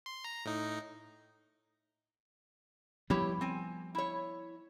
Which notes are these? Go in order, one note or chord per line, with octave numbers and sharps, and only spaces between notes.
C6
A#5
A2 D#4
F3 G3 B3 E4 G4 C#5
C4 G#5
E4 C#5